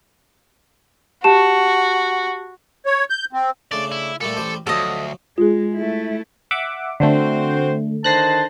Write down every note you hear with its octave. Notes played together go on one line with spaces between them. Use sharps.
F#4 G4 A5 E7
C#5
G6
C4
C#3 A3 D4 D5
E4
A#2 G3 A3 A4
A1 G3 C5
D2 G#2 F3 F#3 A4 D#5
G#3 F4 G#4
A3 E4
E5 F#5 D6
D3 A3 C4 F#4 C5
D3 D#3 C5 A5 F#6 A#6 C7